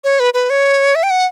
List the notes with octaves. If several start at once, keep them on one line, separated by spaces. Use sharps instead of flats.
C#5
B4
B4
C#5
E5
G5
F#5